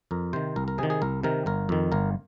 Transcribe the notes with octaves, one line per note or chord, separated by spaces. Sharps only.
F2 A#4
C3 D#3 C5
C2 A#4
A#4
C3 D#3 G#4
G#4
C2 A#4
C3 D#3 A#4
G1 A#4
F2 D#3
G1 A#4